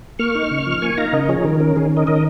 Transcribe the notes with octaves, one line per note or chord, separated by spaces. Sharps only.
A#3 C#6 F6
D#4
C#3
F3
A#3 G#5 C#6
D#4 F5 A#5
C#3 A#4 D#5
F3 G#4 C#5
D#3 A#4
C#4 A#4
D#3 G#4
C#4
A#4 D#5
D#3 A#4 D#5